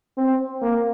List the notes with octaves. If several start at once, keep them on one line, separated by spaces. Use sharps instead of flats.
C4
A#3